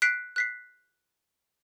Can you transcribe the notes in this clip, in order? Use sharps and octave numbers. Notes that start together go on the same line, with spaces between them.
F#6 B6 C7 D7
F#6 B6 C7